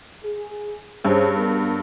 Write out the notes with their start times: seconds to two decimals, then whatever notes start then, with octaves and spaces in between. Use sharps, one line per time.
0.23 G#4
1.05 G2 C#4 G#4 C5
1.37 B3 D4 A#4